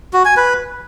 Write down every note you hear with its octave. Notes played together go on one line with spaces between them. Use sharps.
F#4
G#5
B4